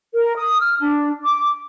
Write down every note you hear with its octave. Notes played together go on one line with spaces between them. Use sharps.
A#4
D#6
F6
D4
D6